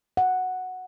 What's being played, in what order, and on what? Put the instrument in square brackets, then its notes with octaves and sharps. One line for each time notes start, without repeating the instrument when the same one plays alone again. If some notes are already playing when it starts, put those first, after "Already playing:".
[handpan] F#5